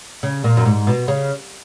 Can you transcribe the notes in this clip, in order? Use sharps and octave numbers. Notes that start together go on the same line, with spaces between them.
C#3
A#2
F#2
G#2
B2
C#3